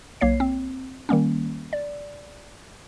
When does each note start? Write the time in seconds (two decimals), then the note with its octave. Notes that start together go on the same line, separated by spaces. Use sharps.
0.21 B1 A#3 C#5 C7
0.40 C4
1.09 D#3 G3 A#3 C#4
1.73 D5